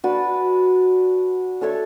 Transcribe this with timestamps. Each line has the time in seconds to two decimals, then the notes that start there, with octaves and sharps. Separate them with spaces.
0.04 D4 F#4 B4
1.61 D4 A4 C#5 E5